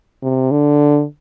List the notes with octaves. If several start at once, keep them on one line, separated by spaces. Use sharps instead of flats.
C3
D3